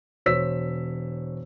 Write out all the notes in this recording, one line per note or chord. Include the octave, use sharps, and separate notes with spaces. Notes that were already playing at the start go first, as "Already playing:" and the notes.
E1 C5 C#5 E6 B6